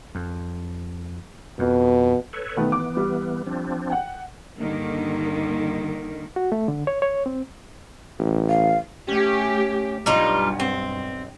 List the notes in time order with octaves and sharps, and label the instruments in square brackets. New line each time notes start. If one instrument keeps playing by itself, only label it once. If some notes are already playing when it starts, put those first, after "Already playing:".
[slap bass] F2
[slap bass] F2 [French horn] B2
[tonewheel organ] A4 B4 C#5
[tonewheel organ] B2 [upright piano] D#3 A3 B3
[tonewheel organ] E3 B3 [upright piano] D6
[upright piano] G3
[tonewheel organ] F3 C4 D4
[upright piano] F#5 G5
[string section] G2 D3 D#3 A#3
[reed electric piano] F#4
A3
D3
C#5
C#5
C4
[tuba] A1
[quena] F5
[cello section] A3 G4 [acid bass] C#4
[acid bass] B1 [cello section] G2 [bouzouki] G3 D#4 F4
[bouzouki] C4